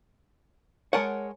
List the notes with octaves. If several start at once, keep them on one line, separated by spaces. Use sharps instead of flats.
G#3 A#4 C#5 F#5 G#5 A5